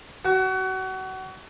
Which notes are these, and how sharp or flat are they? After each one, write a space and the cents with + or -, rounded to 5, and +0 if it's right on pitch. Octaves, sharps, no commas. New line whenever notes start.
F#4 +30